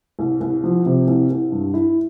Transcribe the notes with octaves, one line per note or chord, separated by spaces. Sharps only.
C2
C2
F3
C3
C2
C2
G2
E4